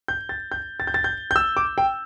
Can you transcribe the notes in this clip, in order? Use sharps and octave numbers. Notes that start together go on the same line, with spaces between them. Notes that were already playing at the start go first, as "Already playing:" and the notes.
G6
A6
G6
A6
G6
A6
G6
G6
E6
D6
G5